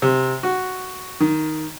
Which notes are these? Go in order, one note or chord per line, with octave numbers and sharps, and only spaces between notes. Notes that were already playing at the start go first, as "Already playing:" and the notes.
C3
F#4
D#3